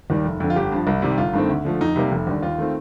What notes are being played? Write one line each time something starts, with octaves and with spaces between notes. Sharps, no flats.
D#2 D#3 G3
F1
F2 D3
F4
G1 G4
G2 F3
C2
C3 D#3 G3
G1 F4
G2 D#3 A3 C4
D2
D3 F3 A3
F2 D#4
C3 G3 A#3
F1
D#2 D3 G3
D#2 F4
D#3 A3 C4